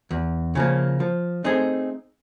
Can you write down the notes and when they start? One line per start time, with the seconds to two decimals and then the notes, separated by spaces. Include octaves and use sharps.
0.11 E2
0.55 C#3 F3 A#3
1.00 F3
1.44 A3 C4 D#4 G#4